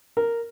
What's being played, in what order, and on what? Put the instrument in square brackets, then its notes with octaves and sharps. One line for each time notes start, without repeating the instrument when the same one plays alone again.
[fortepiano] A#4